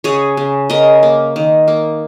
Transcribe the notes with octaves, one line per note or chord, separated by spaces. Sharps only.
C#3 G#4 C#5
C#3
C#3 A#4 D#5
A#3
D#3
A#3